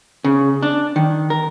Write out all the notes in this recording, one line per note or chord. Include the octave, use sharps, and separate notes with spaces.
C#3
D4
D#3
A#4